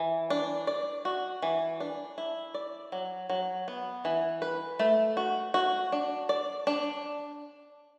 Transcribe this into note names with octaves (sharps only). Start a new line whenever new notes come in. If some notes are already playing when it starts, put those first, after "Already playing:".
Already playing: E3
D4
D5
F#4
E3
D4
E4
D5
F#3
F#3
B3
E3
B4
A3
F#4
F#4
D4
D5
D4